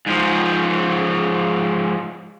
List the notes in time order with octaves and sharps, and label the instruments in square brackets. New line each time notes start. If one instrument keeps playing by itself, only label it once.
[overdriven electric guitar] G#2 F3